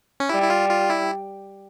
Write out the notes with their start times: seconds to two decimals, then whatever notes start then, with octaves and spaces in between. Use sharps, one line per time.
0.20 C#4
0.29 G3 E4
0.42 E4
0.50 F4
0.70 F4
0.90 E4